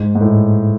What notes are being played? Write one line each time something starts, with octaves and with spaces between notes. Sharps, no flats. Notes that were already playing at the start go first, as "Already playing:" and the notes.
Already playing: G#2
G#2
A2